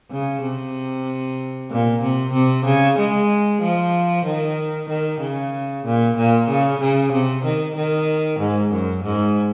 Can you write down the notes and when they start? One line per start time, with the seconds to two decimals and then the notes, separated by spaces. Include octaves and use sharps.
0.11 C#3
0.43 C3
1.71 A#2
2.02 C3
2.34 C3
2.65 C#3
2.98 G#3
3.62 F3
4.26 D#3
4.89 D#3
5.21 C#3
5.85 A#2
6.17 A#2
6.49 C#3
6.80 C#3
7.13 C3
7.45 D#3
7.76 D#3
8.40 G#2
8.72 F#2
9.04 G#2